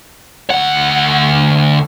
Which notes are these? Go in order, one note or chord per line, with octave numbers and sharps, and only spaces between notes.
D2 F#5